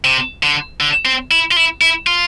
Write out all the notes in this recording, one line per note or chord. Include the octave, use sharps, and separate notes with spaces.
C3
D3
D3
C4
E4
F4
E4
E4
F4